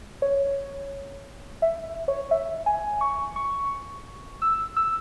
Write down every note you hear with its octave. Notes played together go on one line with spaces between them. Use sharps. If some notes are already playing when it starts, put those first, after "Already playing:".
C#5
E5
C#5
E5
G#5
C#6
C#6
E6
E6